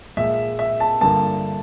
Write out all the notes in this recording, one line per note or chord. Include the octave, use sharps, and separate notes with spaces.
A#2 F3 G#3 E5
E5
A5
G2 D3 F3 A#3 A5